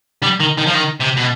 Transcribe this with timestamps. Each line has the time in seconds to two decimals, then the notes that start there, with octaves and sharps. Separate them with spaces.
0.22 G3
0.40 D#3
0.58 D#3
0.66 F3
0.74 D#3
1.00 C3
1.17 B2